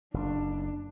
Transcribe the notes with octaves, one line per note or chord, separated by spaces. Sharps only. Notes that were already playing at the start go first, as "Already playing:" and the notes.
F#1 D4